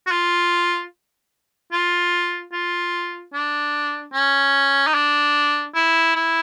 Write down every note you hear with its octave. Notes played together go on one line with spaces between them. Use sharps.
F#4
F4
F4
F4
D4
C#4
D#4
D4
E4
E4